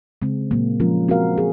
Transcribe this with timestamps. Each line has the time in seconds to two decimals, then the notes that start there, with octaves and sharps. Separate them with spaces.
0.22 C#3 G#3 C4
0.51 A#2 F#3 A#3
0.80 F3 G#3 C#4 F4 A#4
1.08 C4 F#4 A#4 F5
1.38 G#4